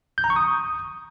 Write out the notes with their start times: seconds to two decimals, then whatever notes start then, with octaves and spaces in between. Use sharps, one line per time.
0.18 G6
0.24 A#5
0.30 C#6
0.36 D#6